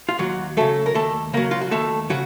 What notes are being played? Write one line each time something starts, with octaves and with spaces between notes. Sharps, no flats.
F4
D#2 F#3 F#4
C#3 F#3 A3 A4
A#4
D#2 A3 A4
C#3 F#3 A#3 A#4
F4
F#4
D#2 A3 A4
C#3 F#3 F#4